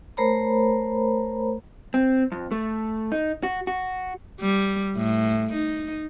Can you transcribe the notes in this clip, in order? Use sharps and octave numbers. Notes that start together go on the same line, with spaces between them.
A3 A#4 C5 C#5 A#5 B5
C4
F2
A3
D#4
F#4
F#4
G3
A2
D#4